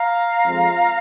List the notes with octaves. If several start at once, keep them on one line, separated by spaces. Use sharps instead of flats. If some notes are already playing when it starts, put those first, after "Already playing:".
Already playing: F5 A#5
F2 F3 G#3